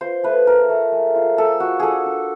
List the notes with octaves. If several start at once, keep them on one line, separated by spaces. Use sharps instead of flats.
F4 C5
A3 B4
A3 A#4
A3
G#3
F4
G#3 A4
F4 F#4
D4 G#4 A4
D4